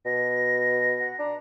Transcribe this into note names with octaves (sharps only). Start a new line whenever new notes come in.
B2 A#6
F#5
D4 A#5